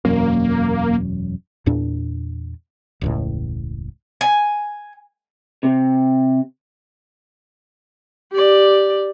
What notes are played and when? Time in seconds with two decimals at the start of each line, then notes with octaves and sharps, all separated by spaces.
0.05 E1 F#2 A#3
1.66 E2 A#2 D4
3.01 E1 C#2 A2
4.21 G#5
5.63 C3
8.32 G4 D5